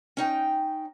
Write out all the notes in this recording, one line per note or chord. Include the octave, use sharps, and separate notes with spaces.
C#4 D#4 G5